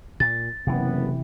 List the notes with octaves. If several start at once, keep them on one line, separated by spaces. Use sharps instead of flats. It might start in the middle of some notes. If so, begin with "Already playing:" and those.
A#2 A6
F#1 C3 E3 B3